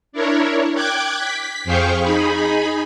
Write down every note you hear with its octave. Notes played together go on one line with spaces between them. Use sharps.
D4 E4 A#4 C#5
G5 D6 F#6 G#6
B6
F2 G#4 C5 F5 G5 C#6
D#4 G#4 B5